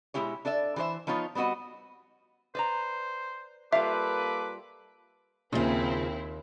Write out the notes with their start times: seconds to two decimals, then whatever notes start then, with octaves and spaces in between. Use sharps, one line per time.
0.14 B2 G#3 C4 E4 G4 C#5
0.45 D4 A4 D5 E5
0.76 E3 G4 A#4 C5 E5
1.07 F3 B3 D#4 F4 C#5
1.35 G3 B3 C4 F#4 D#5
2.55 B4 C5 D5 A#5
3.73 G3 A#3 F4 A4 B4 E5 D6
5.53 D#2 A#2 C#3 F3 C4 D#4 E4